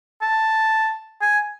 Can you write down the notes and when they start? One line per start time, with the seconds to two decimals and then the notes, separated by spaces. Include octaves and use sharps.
0.22 A5
1.21 G#5